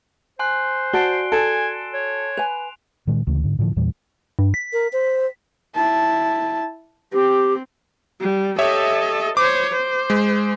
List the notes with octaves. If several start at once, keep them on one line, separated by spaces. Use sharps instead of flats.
C5 G#5 C6 F#6
F#4 D5 A5 C7 D7 G7
A4 G#5 D7 E7
C#5
B4 G#5 F7
A#2 D#3 G#3
D2 C#3 E3 A3
G#2 D3
A2 D3 E3 F3
E2 A#2 E3 G3
G2
B6
A#4
C5
E4 A5
C4 G4
G3
G4 A4 C#5 D#5 E5
C5 C#5 D6
C5
G#3